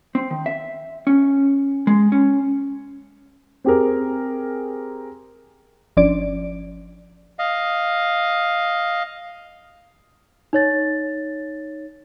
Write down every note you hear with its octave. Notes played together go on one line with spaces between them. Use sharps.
C4
D#3
E5
C#4
G#3
C#4
C4 G4 G#4 A#4
G1 F3 C#4 D4 D5 D7
D#5 F5
D#4 C#5 A6